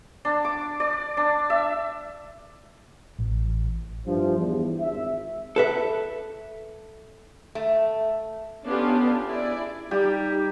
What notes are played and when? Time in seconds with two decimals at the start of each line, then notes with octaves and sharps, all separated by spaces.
0.25 D4
0.45 D6
0.80 D5
1.17 D4
1.50 E5
3.19 A1
4.06 G2 E3 F3
4.37 E2 G2
4.80 G#1 E5
5.56 A4 B4 E5
7.55 A3
8.65 B3 C#4 D4 F4 G4 A4
9.26 E4 G#4 D5
9.91 G3 D#4 G4